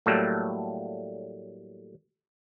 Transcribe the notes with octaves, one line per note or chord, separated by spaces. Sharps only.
A2 F#3 G3 A3 A#3